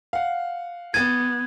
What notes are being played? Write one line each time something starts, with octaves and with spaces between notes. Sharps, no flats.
F5 F#5
B3 G#6 A6 D#7